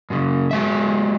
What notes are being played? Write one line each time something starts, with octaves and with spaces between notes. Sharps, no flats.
F#2 C#3
F#3 G#3 E5